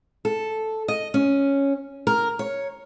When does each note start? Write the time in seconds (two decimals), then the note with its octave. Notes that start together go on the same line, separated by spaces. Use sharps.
0.25 A4
0.88 D#5
1.14 C#4
2.07 A#4
2.39 C#5